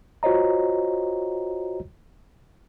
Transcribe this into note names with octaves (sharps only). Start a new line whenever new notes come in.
F4 F#4 C5 C#5 D#5 A#5